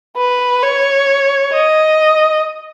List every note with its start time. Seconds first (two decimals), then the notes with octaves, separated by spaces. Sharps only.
0.16 B4
0.62 C#5
1.53 D#5